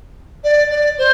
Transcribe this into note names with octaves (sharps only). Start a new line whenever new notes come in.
D5
D5
C5